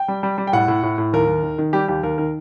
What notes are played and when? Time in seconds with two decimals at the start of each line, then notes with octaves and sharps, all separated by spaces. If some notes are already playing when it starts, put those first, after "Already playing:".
Already playing: G5
0.08 G3
0.23 G3
0.38 G3
0.47 G5
0.53 A2 F#5
0.68 A2
0.83 A2
0.98 A2
1.13 D#2 A#4
1.28 D#2
1.43 D#3
1.58 D#3
1.73 G3 G4
1.88 D#2 G4
2.03 D#2 A#4
2.18 D#3 A#4